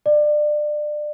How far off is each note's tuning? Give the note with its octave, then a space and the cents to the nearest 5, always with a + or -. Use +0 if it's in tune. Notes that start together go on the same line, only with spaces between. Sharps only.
D5 +25